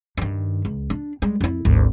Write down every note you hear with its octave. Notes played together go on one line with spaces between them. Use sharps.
G2 D#3
C#2
D4
G3 G#3
F2 E4
G#1 D2